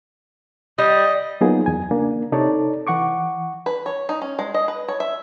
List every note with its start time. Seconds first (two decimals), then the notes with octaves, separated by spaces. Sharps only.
0.78 G3 D#5
1.41 F#3 A#3 B3 D#4 F4 G#4
1.66 E2 G#5
1.91 C#3 A#3 D4
2.32 C3 D#4 A4 C#5 D5 A5
2.87 E3 F#5 C#6 D6
3.66 B4
3.86 C#5
4.09 D#4
4.22 C#4
4.39 G#3
4.54 D#5
4.68 B4
4.88 C#5
5.00 E5